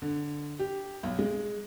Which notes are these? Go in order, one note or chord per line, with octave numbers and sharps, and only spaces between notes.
D3
G4
B1
G#3